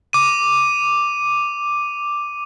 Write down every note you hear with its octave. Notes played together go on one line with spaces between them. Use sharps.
D6 D#7